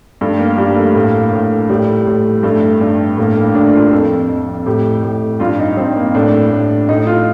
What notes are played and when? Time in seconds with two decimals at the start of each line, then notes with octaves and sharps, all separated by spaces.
0.21 G2 A3
0.39 A#3
0.58 G2 G3
0.77 A3
0.95 A2 A#3
1.33 A2
1.69 A2 G3
2.07 A2
2.43 G2 A3
2.81 G2
3.17 A2 A#3
3.36 A#3
3.54 A2 D4
3.73 F4
3.92 F2 A4
4.29 F2
4.66 A2 G4
5.03 A2
5.40 G2 F4
5.59 D#4
5.77 G2 C4
5.96 A#3
6.15 A2 D4
6.51 A2
6.89 A2 D#4
7.07 F4